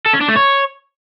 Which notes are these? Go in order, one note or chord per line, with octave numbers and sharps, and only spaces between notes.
A4
C#4
D4
A3
C#5